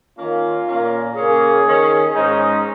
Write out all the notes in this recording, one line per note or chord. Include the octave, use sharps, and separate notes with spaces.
D#3 A#3 C#4 F4
A#2 A#3 C#4
C#3 A#3 C#4 G#4
D#3 C#4
G#2 G#3 C#4 D#4